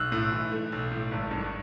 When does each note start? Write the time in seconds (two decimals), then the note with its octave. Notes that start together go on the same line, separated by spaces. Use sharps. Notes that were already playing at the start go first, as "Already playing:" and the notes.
Already playing: B1 E6 F#6
0.12 A2
0.32 E3
0.52 A3
0.72 B1
0.91 A2
1.11 G#1
1.31 G2